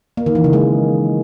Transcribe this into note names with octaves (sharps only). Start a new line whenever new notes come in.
A#3
D#3
E3
C#3
G#3